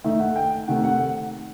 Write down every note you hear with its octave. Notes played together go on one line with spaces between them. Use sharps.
D#3 A3 D#4 E5
F#5
G5
C3 D#3 A3 F#5
F#5